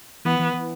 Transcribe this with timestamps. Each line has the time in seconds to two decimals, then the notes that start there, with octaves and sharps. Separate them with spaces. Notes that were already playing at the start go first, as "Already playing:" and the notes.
0.25 E3 B3
0.39 E3
0.54 E3